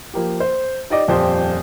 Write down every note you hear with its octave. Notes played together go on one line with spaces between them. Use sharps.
F3 A#3 G4
C5
D#4 G4 D5 D#5 D6
D#1 F2 G4 C5 D5